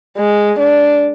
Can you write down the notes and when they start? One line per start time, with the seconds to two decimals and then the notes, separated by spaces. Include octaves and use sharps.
0.18 G#3
0.59 D4